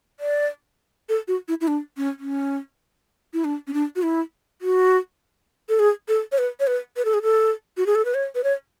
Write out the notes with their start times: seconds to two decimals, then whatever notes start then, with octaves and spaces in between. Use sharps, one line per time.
0.20 D5
1.09 A4
1.28 F#4
1.48 E4
1.61 E4
1.68 D4
1.97 C#4
2.19 C#4
3.34 E4
3.45 D4
3.67 C#4
3.74 D4
3.96 F#4
4.03 E4
4.62 F#4
5.69 A4
5.79 G#4
6.08 A4
6.32 C#5
6.38 B4
6.60 C#5
6.67 B4
6.97 B4
7.05 A4
7.14 G#4
7.22 A4
7.77 F#4
7.86 G#4
7.95 A4
8.05 B4
8.14 C#5
8.35 B4
8.44 C#5